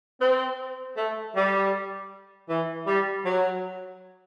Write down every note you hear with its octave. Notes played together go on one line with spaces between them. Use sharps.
C4
A3
G3
E3
G3
F#3